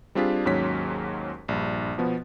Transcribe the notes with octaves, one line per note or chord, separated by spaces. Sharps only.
G3 C4 D4 F4 G#4 B6
D#2 G#2 F#3 C#4 B6
A#1 G2
B2 F3 B3